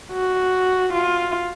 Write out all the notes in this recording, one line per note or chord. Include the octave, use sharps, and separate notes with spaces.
F#4
F4